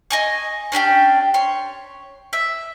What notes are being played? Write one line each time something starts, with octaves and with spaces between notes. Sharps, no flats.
D#5 G#5 C#6
C#4 D4 G4 G5
C#5 C6
E5